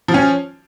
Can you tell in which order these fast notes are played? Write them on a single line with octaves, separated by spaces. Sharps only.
F3 F4 C#4